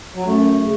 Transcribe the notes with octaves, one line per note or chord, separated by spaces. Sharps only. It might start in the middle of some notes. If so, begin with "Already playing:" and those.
F#3
F#2 A3
C#3